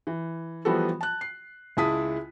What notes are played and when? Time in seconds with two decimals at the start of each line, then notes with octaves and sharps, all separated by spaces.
0.07 E3
0.65 E3 F3 G3 B3 F#4 A4
1.01 A5 F#6
1.21 C7
1.77 C#2 G#3 E4 A5 D#6 B6